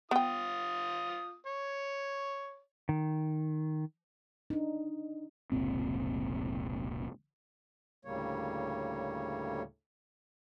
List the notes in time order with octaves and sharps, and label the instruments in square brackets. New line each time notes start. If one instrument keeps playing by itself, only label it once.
[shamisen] B3 G5 [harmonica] F4 D#6
[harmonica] C#5
[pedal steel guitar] D#3
[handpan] D4 D#4
[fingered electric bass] F1 C#2 A#2 C4
[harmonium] D2 A2 C#3 G3 A#3 C#5